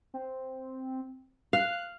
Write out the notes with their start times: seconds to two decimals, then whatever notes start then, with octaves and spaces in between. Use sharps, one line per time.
0.14 C4
1.53 F5 F#6